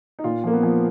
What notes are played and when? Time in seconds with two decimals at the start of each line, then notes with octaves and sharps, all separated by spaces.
0.19 D#4
0.24 A#2 F4
0.44 F3 A#3
0.53 B3
0.63 F3